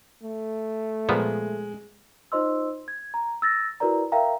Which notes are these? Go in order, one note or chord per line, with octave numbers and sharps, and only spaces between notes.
A3
A#2 F3 G#3 B3
D#4 F4 C5 D#5 C6 E6
G#6
A#5
E6 A6 A#6
E4 F#4 A#4 B4 D5 A#5
A#4 E5 F5 G5 A#5